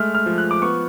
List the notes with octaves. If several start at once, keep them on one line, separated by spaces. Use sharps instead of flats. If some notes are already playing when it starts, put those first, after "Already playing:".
Already playing: G#3 A3 F6
F6
F3
F#6
D6
B3 C#6